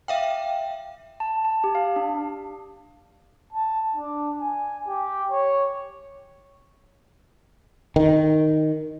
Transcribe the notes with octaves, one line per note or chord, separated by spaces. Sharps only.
E5 F5 G5
A5
A5
G4
F5
D4
A5
D4
G#5
G4
C#5
D#3